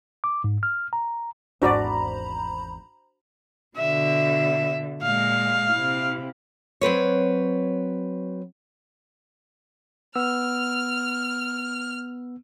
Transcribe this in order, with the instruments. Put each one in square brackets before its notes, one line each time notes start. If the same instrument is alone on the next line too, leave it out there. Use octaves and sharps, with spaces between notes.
[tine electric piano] D6
G#2
F6
A#5
[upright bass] G#1 E2 [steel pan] D4 F#4 D5 [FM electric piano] C5 A#5 B5
[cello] B2 D3 [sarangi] E5
[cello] A#2 G#3 [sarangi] F5
[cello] C3 E4
[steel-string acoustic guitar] F#3 C4 B4 C#5
[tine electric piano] B3 E6 [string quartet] F6